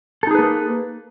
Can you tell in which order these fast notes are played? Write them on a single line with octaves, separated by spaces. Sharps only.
A4 D#4 G#4 B4 A#3